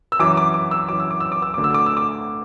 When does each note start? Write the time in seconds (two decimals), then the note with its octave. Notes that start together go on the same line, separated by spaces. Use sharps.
0.12 E6
0.19 F#2 E3 D6
0.37 D6
0.54 D6
0.71 E6
0.88 F#2 E3 D6
1.00 E6
1.10 D6
1.20 E6
1.32 D6
1.42 E6
1.54 D2 D3 D6
1.64 E6
1.74 D6
1.86 E6
1.97 D6